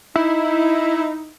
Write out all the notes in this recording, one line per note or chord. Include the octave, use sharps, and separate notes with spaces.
D#4 E4